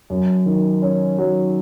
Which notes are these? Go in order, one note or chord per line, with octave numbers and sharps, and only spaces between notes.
F#2
D#3
C#4
F#3